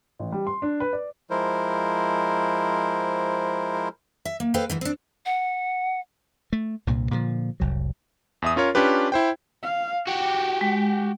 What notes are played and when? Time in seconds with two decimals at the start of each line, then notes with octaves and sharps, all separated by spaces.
0.19 A1
0.32 G3
0.47 C6
0.62 D4
0.80 B4
0.93 D5
1.30 F3 G#3 E4 A#4 C5
4.25 E5
4.40 A#3
4.54 A4 B4 C5 D#5 F5 G5
4.70 G#2 D#3 E3
4.81 C4 D4
5.25 F#5
6.53 A3
6.87 C2 G2 A#2
7.11 A#2 D3 E3 F3
7.60 F1 C2 F#3
8.42 E2 E5 D#6
8.56 C#4 F4 A#4 C#5
8.75 C#4 D4 F4 G4 B4
9.12 E4 C5 G5
9.63 F5
10.07 F#4 G4 G5
10.61 G#3